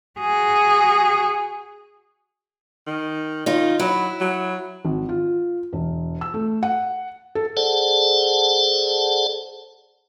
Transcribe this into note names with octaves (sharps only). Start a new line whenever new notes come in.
F#4 G#4
D#3
D#3 D#4 F4
F#3 E4
F#3
G#1
F4
E1
E6
A3
F#5
A4
G#4 A4 C5 D5 F#5 A5